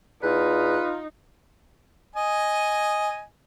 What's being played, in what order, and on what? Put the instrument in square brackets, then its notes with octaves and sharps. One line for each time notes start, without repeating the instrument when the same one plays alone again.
[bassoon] E2 [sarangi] D#4 [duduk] F4 [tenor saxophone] B4
[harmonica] D#5 G#5